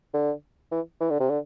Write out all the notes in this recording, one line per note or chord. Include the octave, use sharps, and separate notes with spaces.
D3
E3
E3
D3
C3
D3